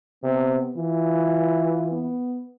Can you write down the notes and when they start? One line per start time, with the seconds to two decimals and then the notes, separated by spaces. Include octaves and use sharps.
0.23 C3 B3
0.76 E3 F4
1.92 B3